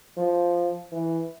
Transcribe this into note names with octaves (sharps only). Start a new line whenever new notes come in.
F3
E3